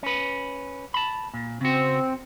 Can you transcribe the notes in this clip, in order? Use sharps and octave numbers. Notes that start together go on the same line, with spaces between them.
C#4 B4
A5 B5
A#2
C#3 C4 F#4